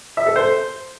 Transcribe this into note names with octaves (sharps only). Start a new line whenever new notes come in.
E5
A4
C5